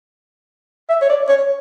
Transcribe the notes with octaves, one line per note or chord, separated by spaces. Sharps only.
E5
C#5
D5
C#5